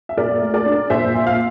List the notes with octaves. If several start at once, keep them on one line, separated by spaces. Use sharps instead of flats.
E5
A#2 A#4 D5
A3
A#4 D5
D4
A#2 C5 E5
A#2
F5